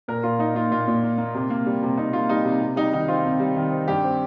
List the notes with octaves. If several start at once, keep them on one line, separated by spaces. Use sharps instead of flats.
A#2 A#4
A#2 F4
A#3 D#4
A#3 F4
A#2 F4
A#2
A#3
A#3
C3
A#3
G3
C3
C3 D#4
A#3 F4
G3 D#4
C3
C3
G3 D#4
D#3 D#4
C4 F4
C3
G3
D#3
C4
G2 G4
C4